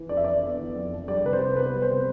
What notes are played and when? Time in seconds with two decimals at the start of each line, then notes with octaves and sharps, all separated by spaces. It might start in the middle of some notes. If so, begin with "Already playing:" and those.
Already playing: E3
0.09 F2 D5
0.17 E5
0.24 D4 D5
0.43 B3
0.59 E3
0.75 F2
0.92 D4
1.08 G3 D5
1.25 C3 B4
1.33 C5
1.41 C2
1.57 B3 B4
1.74 G3
1.82 C5
1.91 C3